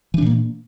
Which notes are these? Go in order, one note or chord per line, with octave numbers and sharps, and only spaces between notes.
A#2 E3 A#3 D4